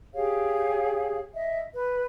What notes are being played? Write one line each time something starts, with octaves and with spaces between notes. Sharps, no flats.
G4 G#4 C#5 F5
D#5 E5
B4